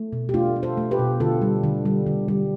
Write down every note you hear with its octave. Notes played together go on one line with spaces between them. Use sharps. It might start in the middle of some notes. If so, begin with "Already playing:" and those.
Already playing: A3
B2
G4
A3 D4 F4
A3
A4 C5
A3
G4 B4
B2
D3 F4 A4
G3
D3
G3
D3
G3